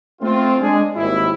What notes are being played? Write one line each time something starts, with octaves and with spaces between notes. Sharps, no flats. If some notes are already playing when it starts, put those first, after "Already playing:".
A3 C4 F4
G#3 D4 G#4
G#1 D#2 G#2 G3 E4